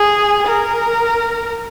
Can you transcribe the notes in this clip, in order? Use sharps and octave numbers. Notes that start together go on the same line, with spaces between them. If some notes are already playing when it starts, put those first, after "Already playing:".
Already playing: G#4
A#4